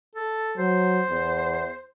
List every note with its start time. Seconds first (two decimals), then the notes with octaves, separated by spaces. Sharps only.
0.15 A4
0.57 F#3 C5
1.10 E2